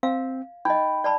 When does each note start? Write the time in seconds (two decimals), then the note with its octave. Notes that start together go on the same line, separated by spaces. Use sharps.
0.03 C4 F5
0.65 D#4 D#5 G5 B5
1.04 D5 A5 B5